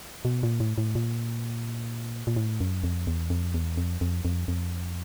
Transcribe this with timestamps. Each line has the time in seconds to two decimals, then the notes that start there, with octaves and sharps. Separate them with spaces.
0.25 B2
0.43 A#2
0.60 A2
0.78 A2
0.95 A#2
2.27 A#2
2.36 A2
2.61 F#2
2.84 F2
3.07 E2
3.30 F2
3.54 E2
3.77 F2
4.01 F2
4.25 F2
4.48 F2